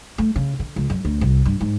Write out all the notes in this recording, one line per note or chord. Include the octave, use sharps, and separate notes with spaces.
A3
C#3
D3
C#2
F#2
D2
C2
G2
G#2